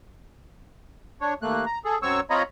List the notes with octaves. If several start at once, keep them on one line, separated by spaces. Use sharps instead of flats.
D4 C#5
D#2 A3 A#3 F#6
A#5
G#4 A4
F#2 F#3 C4 C#5 C#6 E6
C4 F4 C#5 D#5 A#5 B5